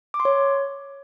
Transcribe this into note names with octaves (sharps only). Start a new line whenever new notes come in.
D6
C6
C#5